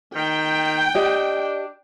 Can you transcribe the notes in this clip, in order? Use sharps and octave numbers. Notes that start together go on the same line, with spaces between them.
D#3 G5
D4 G4 D#5